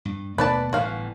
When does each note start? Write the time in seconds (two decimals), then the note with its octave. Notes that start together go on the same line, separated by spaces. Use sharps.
0.05 G2
0.38 D#2 B2 A3 B4 D5 A5
0.73 G1 A2 E3 F#4 F5